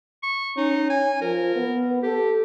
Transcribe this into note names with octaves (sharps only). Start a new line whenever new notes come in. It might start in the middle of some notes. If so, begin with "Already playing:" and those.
C#6
C#4 D#4
G#5
F3 A#4
B3
G4 A4